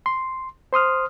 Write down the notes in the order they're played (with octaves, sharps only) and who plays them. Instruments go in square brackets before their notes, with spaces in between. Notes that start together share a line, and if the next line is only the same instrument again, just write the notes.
[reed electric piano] C6
C5 C6 D#6 F6